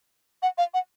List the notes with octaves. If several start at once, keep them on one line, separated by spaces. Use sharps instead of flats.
F#5
F5
F#5